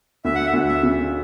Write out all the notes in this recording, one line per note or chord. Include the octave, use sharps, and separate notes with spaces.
D2 E5
F#5
E5
D2
E5
C#3